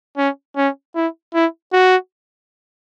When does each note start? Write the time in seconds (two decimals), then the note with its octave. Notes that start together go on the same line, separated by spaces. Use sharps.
0.17 C#4
0.57 C#4
0.95 E4
1.34 E4
1.73 F#4